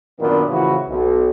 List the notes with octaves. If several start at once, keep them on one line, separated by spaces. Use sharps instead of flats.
F#2 A#2 D#3 A#3 B3 D4
A2 C#3 E3 F3 E4 F#4
B1